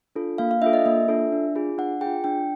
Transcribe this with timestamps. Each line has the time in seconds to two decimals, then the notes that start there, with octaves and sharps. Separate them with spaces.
0.15 D4 F4 A4
0.38 A#3 F5
0.51 F5
0.62 D4 F4 A4 E5
0.73 D#5
0.86 A#3 E5
1.08 D4 F4 A4
1.32 D4
1.55 F4 G#4
1.78 D4 F#5
2.01 F4 G#4 G5
2.24 D4 G5